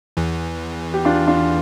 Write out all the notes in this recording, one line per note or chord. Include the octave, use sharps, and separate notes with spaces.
E2 E3
G4
D4 F4
D4 F4